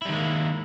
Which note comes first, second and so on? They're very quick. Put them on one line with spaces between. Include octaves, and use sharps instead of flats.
E4 G3 D#3 G#3 A#3